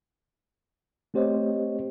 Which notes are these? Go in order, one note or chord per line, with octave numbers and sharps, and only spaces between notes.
A3 C4 G4 C5 C#5 D#5